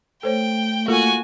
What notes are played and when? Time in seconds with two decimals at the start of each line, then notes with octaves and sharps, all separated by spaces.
0.23 A3 A4 C5 C#5 G5
0.88 A#3 F4 F#4 A4 G#5